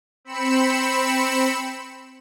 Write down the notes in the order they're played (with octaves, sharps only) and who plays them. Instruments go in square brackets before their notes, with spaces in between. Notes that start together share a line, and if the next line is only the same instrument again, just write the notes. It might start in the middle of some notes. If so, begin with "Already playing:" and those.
[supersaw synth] C4 B5 C#7 E7